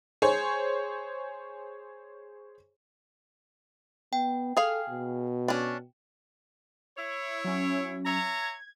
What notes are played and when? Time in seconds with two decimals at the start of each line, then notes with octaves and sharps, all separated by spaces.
0.22 G#4 C5 C#5
4.13 B3 G5
4.57 G#4 A4 F5
4.89 B2
5.48 C#4 D4
6.98 E4 C#5
7.44 F#3 C#4
8.05 C#5 E5 A#5
8.42 G#6